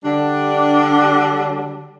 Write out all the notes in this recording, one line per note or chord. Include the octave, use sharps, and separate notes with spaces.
D3 G3 D4